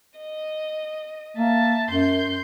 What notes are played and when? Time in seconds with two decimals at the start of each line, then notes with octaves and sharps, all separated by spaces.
0.19 D#5
1.37 A#3 E5 A5
1.91 F#2 C6 G6